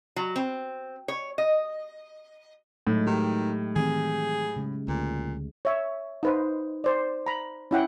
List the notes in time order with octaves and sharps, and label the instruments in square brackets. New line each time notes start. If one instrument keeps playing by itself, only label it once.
[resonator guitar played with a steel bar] F#3
C4
C#5
D#5
[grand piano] A2 [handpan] F#3 G#3 D#4
[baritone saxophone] D#3 [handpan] G4
[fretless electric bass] D#3 E3 C4 [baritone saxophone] G#4
[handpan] C#3 G#3
[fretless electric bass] D2 [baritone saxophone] A#2
[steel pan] C#5 E5
D#4 B4 C5
C5 D5
A#5 B5
C#4 E4 F#5 G5